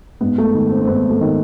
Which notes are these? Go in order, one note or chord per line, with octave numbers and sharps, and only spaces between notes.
G#2 B3
A3
D#3
C4
C4
G#2 B3
A3
D#3